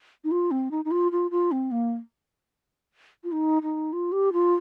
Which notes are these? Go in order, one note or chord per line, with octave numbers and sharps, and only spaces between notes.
D#4
F4
C4
D#4
D#4
F4
F4
F4
C4
A#3
F4
D#4
D#4
F4
G4
F4